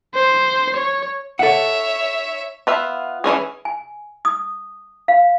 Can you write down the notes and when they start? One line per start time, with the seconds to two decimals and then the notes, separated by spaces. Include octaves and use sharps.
0.15 C5
0.76 C#5
1.39 A4 C#5 E5 F#5
2.67 B3 F4 E5
3.24 E3 G#3 C#4 G#4
3.65 G#5
4.25 D#6
5.08 F5